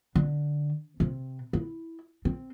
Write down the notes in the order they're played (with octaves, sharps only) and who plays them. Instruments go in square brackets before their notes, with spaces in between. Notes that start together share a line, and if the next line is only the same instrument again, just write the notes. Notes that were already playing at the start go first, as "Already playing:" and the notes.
[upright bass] D3
C3
E4
C4